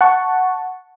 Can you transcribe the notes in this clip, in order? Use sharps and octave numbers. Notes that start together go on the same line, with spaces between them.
F#5 A5 C#6